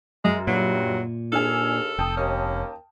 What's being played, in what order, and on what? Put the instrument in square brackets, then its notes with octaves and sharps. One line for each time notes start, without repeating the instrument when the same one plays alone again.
[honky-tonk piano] F#2 [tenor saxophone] G#3
[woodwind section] G2 [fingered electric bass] A#2 [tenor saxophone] F#3
[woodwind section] D#2 E6 F6 [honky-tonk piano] D4 G#4 [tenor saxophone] A4
[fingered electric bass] F1 [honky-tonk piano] G5 A5 D#6
[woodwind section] D#2 A#3 [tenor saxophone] C#4